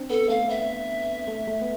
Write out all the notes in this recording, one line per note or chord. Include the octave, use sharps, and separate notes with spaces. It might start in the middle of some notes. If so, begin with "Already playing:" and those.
Already playing: C4 D4
B3 A4
A3 F5
B3 E5
A3
A3
B3